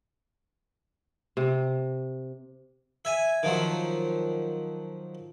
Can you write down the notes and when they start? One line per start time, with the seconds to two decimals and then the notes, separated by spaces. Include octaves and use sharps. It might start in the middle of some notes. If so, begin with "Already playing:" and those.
1.37 C3
3.05 E5 G#5
3.43 D#3 F3 F#3